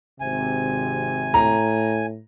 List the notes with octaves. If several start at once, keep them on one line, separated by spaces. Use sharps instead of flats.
G#1 C3 G#5
A2 A#5